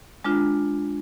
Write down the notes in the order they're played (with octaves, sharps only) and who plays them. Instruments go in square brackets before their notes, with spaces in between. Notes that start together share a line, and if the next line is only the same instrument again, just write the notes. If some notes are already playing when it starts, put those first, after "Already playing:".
[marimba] G#3 D4 F4